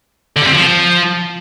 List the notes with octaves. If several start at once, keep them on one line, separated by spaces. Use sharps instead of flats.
D3
G3
C4
F3